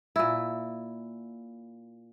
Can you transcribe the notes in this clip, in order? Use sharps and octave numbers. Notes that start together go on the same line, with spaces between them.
A#2 E4